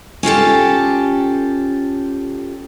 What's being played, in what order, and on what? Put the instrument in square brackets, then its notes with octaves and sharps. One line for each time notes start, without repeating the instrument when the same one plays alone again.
[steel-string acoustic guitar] C#4 F4 G4 A4